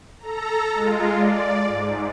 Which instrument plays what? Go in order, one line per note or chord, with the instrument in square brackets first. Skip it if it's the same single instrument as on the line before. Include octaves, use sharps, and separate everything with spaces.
[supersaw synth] A4 A#5
G#3 F4
D5
G#2